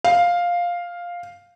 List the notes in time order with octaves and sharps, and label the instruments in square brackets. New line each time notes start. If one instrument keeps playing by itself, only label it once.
[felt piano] F5